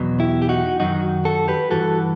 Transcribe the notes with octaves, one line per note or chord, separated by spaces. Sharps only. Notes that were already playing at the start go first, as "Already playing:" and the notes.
Already playing: E2 B2 F#3
E4 G4
G4
D#4 F#4
F#2 D#3 F#3 D#4 F#4
F#4 A4
G4 B4
G2 E3 F#4 A4